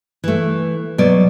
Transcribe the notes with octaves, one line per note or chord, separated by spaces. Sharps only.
E3 A3
B2 F#3 D5